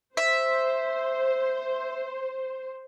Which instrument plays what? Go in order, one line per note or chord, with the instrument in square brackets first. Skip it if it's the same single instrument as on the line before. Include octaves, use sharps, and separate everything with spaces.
[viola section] C5 [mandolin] E5